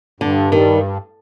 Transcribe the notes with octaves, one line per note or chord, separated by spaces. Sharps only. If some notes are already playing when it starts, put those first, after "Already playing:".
G2 D3
D#3 G3